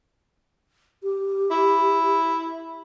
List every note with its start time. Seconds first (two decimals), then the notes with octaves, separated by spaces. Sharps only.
1.03 G4
1.51 E4